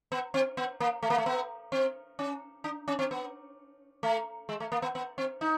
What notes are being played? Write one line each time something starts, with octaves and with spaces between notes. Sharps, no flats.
B3
C4
B3
A#3
A3
A#3
A3
B3
C4
C#4
D4
C#4
C4
B3
A3
G#3
A3
A#3
B3
B3
C4
D#4